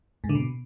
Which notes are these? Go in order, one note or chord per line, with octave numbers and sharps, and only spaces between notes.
G#2
D3
B2